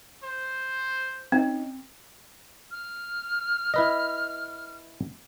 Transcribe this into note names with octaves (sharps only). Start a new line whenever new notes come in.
C5
C4 C#4 D#4
F6
E4 B4 D#5